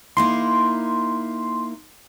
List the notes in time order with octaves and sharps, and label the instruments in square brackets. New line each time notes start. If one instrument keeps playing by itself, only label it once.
[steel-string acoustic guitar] A#3 D#4 E4 [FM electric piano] C6